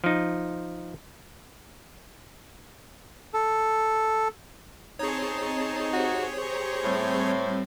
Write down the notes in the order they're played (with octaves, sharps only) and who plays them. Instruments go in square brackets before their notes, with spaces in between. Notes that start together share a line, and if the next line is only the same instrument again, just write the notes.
[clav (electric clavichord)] F3 D#4
[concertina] A4
[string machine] C4 A5 C6 [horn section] D#4 [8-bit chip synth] G#4 C#5
[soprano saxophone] F#4 [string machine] G4 C5
[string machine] G4 A#5 C#6 [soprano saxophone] C5
[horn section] A2 [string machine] G3 C4